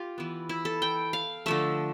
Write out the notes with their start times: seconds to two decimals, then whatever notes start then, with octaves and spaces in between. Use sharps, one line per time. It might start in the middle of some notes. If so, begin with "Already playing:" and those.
Already playing: F4 G4
0.18 E3 B3
0.49 E4
0.65 A4
0.82 G5
1.13 F5
1.46 D3 F3 A3 E5